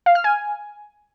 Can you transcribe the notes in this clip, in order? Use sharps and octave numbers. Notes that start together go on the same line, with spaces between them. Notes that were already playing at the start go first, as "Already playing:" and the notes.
F5
F6
G#5